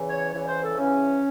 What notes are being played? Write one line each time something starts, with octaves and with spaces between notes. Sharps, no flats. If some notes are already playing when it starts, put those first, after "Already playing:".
Already playing: E2 C#3 E3
C#5
E2 C#3 E3 C#5
C5
A4
E2 C#3 E3 C#4